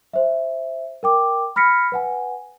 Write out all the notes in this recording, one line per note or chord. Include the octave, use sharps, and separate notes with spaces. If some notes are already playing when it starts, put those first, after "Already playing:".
C5 E5
A#4 G5 D6
B5 F6 A#6 B6 C#7
B4 F#5 G#5